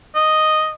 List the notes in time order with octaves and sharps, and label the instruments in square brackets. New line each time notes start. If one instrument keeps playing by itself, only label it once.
[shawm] D#5